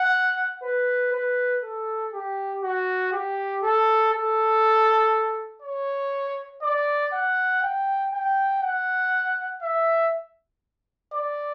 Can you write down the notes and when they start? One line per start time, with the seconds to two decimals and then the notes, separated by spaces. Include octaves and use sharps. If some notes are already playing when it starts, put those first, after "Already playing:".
Already playing: F#5
0.63 B4
1.12 B4
1.63 A4
2.13 G4
2.63 F#4
3.12 G4
3.63 A4
4.12 A4
5.62 C#5
6.63 D5
7.13 F#5
7.63 G5
8.13 G5
8.62 F#5
9.62 E5
11.13 D5